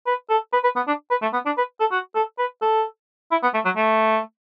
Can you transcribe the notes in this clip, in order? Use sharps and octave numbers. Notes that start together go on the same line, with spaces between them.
B4
A4
B4
B4
B3
D4
B4
A3
B3
D4
B4
A4
F#4
A4
B4
A4
E4
B3
A3
F#3
A3